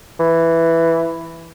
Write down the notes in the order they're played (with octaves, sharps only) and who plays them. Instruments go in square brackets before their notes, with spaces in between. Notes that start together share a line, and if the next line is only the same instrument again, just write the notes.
[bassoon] E3